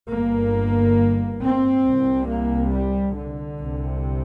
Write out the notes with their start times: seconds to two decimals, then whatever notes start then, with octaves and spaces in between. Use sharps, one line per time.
0.11 G1 G2 A#3
1.42 C4
1.85 C2 C3
2.29 A#3
2.71 G3
3.15 D3
3.59 C2 C3